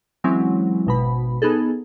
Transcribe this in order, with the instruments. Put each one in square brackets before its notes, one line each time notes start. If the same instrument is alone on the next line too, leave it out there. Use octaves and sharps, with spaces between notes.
[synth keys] E3 F#3 G#3 C4 C#4 E4
G#1 B2 B5
B3 D#4 G#4 A4